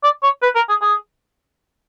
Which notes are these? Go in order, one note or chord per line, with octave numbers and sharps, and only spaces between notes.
D5
C#5
B4
A#4
G#4
G#4